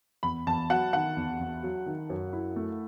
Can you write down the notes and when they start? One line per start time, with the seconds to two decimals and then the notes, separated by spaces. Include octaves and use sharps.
0.23 E2 B5
0.47 E2 A5
0.70 F#3 F#5
0.93 D#3 F#5
1.17 E2
1.39 E2
1.63 F#3
1.86 D#3
2.10 F#2
2.33 E4
2.56 A3